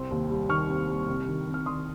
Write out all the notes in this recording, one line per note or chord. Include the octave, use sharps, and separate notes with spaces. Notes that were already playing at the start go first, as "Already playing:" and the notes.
Already playing: C2 C4 C6
D#2
G3
D#3 C#6 F6
C4
G3
C2
D#3
C2
F6
D#3 C6 D#6